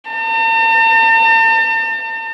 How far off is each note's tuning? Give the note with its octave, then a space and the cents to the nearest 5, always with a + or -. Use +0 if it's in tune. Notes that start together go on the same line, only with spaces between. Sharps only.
A5 +45